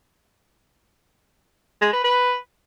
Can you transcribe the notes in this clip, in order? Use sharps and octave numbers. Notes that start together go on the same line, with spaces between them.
G#3
B4
B4